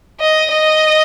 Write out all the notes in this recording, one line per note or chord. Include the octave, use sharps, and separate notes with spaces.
D#5
D#5